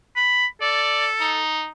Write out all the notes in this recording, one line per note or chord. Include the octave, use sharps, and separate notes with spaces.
B5
A4 D5
D#4